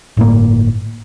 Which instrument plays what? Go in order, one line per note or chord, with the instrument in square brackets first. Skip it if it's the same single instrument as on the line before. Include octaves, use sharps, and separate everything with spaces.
[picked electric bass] G1 A2 A#3